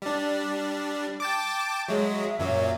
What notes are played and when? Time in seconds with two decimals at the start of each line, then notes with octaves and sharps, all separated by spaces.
0.02 G3 D4
1.20 G5 A5 D6
1.88 F#3 G#3 E5
2.39 F#2 A#2 F#3